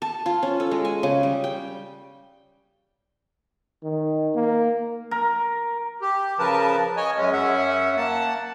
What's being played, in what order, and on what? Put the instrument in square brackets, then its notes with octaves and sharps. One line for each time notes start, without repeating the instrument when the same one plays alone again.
[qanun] A5
F4
C#4
A4
G#3
G#5
C#3
G3
G5
[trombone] D#3
A#3
[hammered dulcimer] A#4
[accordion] G4
C#3 F3 A#4 B4 A5
C#5 D#5 G#5
F#2 G#3 C#4
F#2 C#4 E5 F#5
A#3 F#5 A5